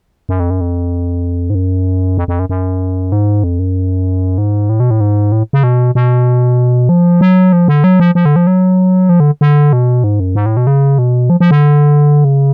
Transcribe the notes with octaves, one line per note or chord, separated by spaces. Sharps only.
F#2
F2
F#2
F2
G#2
F#2
F2
F2
F#2
F#2
G#2
F2
F#2
G#2
A2
B2
A2
G#2
A2
C#3
B2
B2
F3
F#3
F3
D3
F#3
F3
F3
D3
F3
F#3
F3
D3
D3
B2
G#2
F#2
G#2
A2
B2
C#3
B2
F3
F3
D3
C#3